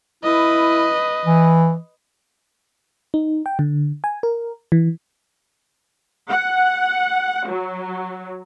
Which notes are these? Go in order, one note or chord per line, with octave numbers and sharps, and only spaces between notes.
E4 B4 D#5
E3
D#4
G5
D3
G#5
A#4
E3
F#5
F#3